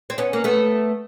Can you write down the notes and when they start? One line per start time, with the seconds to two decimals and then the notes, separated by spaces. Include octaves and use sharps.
0.10 C4
0.18 B3 C#4
0.33 A#3
0.44 A3 B3